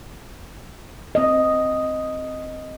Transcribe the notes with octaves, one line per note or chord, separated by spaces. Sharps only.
C4 D#5